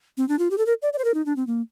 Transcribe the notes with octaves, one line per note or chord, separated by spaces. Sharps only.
C4
D4
F4
G4
A4
A#4
D5
D5
C5
A#4
D#4
D4
C4
A#3